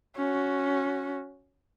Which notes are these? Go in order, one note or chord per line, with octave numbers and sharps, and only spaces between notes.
C#4 F#4